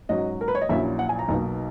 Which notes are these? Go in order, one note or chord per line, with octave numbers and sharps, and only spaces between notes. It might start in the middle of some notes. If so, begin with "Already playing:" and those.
G#2 F#3 C#4 D#5
A#4
B4
C#5
D#5
A#1 A#2 F#3 C#4 E4 E5
F#5
G#5
A#5
B1 B2 A#3 D#4